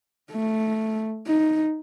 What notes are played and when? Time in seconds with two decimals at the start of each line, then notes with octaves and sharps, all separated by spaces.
0.32 A3
1.27 D#4